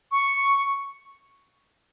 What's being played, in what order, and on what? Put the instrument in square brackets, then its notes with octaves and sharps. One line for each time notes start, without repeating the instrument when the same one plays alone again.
[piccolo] C#6